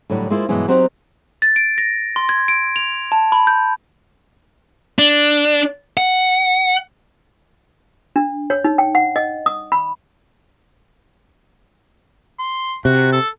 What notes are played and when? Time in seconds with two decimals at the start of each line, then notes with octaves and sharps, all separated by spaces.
0.10 A2 D3 F#3 G3
0.30 G#3 A#3 E4 F4 C5
0.49 G2 B2 E3 F#3 G#3
0.68 F#3 C4 D#4 G4 F#5
1.42 A6
1.56 D7
1.78 A#6
2.16 C6
2.29 G#6
2.48 D7
2.76 F7
3.12 A5
3.32 B5
3.47 G6
4.99 D4
5.97 F#5
8.16 D4
8.50 C#5
8.64 D#4
8.78 G5
8.95 F#5
9.16 D#5
9.46 D#6
9.72 B5
12.39 C6
12.85 C3 F#4
13.12 A4